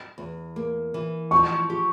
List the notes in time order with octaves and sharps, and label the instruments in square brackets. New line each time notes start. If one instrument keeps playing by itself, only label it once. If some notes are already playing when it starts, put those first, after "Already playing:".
[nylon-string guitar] E2
A#3
E3
[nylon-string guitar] F3 [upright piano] C#6
[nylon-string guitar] G4